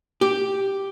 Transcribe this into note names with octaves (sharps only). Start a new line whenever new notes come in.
G4